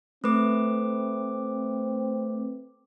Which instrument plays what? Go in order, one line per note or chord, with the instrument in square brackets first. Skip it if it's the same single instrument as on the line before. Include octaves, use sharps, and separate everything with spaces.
[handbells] A3 B4 D6 [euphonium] C4